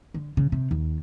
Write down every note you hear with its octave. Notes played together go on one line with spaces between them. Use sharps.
D3
C#3
C3
D#2